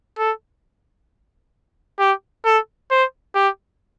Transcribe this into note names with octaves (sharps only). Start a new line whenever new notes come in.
A4
G4
A4
C5
G4